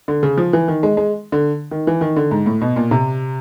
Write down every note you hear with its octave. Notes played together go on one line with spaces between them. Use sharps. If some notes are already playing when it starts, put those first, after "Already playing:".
D3
C#3
F3
E3
D#3
G#3
G#3
D3
D#3
E3
D#3
D3
G#2
A2
B2
A#2
C3